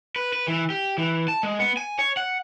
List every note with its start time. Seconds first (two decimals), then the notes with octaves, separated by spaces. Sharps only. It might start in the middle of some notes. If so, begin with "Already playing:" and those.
0.16 B4
0.33 B4
0.48 E3
0.70 G4
0.98 E3
1.28 A5
1.43 G#3
1.60 B3
1.77 G#5
1.99 C#5
2.17 F#5